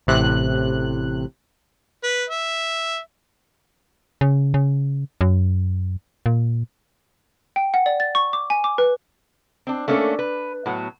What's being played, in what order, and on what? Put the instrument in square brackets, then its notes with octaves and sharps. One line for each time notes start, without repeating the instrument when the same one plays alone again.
[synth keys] A1 A2 C3 F#6
[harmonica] B4
E5
[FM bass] C#3
C#3
F#2
A#2
[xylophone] G5
F#5
D5
A6
C#6
D6
G#5
D6
B4
[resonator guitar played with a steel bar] C4 D4
A3 A#3 C#4 D4 G4 A4
B4
A2 F#3 B3